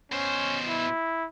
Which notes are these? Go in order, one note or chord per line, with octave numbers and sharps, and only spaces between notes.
B2 C#4 C5
E4